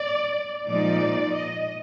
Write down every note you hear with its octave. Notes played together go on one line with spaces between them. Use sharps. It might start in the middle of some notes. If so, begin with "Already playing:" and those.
Already playing: D5
A#2 F3 G#3 D#4 D5
D#5